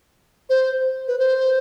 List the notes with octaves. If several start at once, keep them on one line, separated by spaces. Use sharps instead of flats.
C5
B4
C5